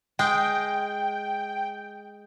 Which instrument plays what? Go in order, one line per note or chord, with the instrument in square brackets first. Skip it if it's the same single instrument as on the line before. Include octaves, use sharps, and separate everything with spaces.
[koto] G#3 [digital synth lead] G5